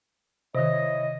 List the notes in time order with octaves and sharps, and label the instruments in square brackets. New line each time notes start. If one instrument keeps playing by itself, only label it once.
[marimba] C3 D#3 [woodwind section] E4 C#5 D#5